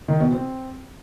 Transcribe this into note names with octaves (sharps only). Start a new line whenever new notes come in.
D#3
B2
C4